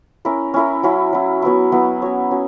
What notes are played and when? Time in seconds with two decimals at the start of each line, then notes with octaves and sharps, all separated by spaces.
0.25 C#4 E4 A#4
0.54 C#4 E4 A#4
0.83 F#3 C#4 E4
1.13 F#3 C#4 E4
1.42 F#3 B3 E4
1.72 F#3 B3 E4
2.02 C#4 F#4 C#5
2.31 C#4 F#4